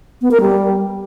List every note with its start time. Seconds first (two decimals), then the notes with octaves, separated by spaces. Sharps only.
0.22 B3
0.31 A#4
0.41 G3